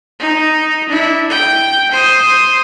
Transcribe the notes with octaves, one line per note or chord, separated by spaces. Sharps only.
D#4
D4 E4
G5
C5 D#6